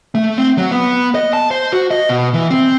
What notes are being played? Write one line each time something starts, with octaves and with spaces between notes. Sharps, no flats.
A3
C4
F#3
B3
D#5
A5
C5
F#4
D#5
B2
E3
C4